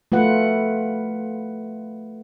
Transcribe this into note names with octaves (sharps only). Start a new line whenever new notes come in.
A3 F4 B4 F#5